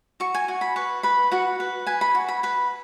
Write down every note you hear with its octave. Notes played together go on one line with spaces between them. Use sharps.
F#4 C#6
G#5
F#4
B5
B4 C#6
B4 B5
F#4 F#5
B4
B4 G#5
B5
F#4
B5
B4 B5